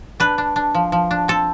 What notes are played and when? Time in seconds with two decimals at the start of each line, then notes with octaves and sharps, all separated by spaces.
0.20 D4 B4
0.38 D4
0.56 D4
0.75 F3
0.92 F3
1.11 D4
1.28 C4 A4